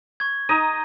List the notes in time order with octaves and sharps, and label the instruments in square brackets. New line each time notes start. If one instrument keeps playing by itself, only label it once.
[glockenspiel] C#6 G#6
[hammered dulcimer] D#4 D#5 [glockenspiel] A#5 D#6 D#7